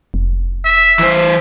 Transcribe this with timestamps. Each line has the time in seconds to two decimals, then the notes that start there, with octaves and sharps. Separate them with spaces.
0.14 F1
0.65 E5
0.99 E3 C5